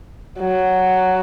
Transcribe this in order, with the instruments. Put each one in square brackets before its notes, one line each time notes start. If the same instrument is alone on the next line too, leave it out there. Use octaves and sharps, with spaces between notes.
[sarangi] F#3